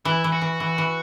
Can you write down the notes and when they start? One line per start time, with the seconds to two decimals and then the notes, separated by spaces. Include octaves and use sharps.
0.05 E3 E4
0.24 E3
0.32 F#4
0.42 E3
0.60 E3
0.78 E3